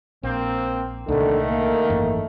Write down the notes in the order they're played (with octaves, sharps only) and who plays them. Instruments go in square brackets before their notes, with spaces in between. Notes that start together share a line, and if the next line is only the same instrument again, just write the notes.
[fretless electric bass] A#1 [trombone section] A#3 C4
[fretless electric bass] C2 A#2 [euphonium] D3 [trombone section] D#3 A3
[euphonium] A#3
[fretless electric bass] G#1 F#2 E3